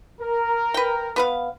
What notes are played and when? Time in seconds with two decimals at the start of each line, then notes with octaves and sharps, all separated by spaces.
0.21 A#4
0.74 B4 G5
1.16 B3 B4 F5